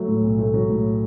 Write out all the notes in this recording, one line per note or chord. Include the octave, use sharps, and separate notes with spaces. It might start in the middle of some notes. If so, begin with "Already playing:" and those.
Already playing: F#3 A3
A2
B1
A3
F#3
A2